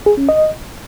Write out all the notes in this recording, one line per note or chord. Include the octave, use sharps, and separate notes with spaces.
G#4
C#4
D#5